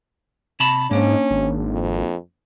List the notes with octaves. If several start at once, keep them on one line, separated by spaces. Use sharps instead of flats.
C3 A5 B5
G#2 A#3 C#4 D4
G#1
F2